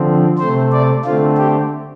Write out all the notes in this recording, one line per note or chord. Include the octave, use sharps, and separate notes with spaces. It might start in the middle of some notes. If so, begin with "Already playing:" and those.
Already playing: D3 F3 C4
C3 A3 C4 C5
D5
D3 A3 C4 F4
G4